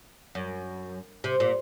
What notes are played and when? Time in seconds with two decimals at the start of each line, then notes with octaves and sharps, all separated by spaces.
0.35 F#2
1.24 C3
1.40 A#2